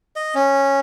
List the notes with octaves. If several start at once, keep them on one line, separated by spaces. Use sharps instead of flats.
D#5
C#4